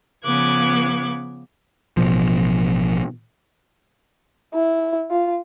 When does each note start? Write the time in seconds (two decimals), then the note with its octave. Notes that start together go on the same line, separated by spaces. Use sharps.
0.23 C#3 F3 B3 D6 F#6 G#6
1.97 A1 B2 F3
4.54 E4
5.11 F4